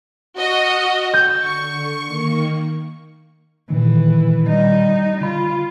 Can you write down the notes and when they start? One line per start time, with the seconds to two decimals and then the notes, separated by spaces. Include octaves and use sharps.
0.38 F#4 D#5 F6
1.14 E6 G6 A6
1.42 D3 C#6
2.04 D#3 A#3
3.70 A#2 D#3 E3
4.47 G3 D#4
5.21 D3 F4 B5